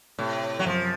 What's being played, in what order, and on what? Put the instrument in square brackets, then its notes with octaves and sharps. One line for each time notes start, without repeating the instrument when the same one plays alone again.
[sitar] A2 [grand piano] C3
[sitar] F#3
[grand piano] F#2 [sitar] F3